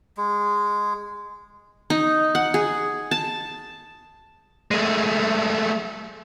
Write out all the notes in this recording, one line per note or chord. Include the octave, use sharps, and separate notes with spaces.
G#3
D#4
F#5
G#4
A5
G#3 A3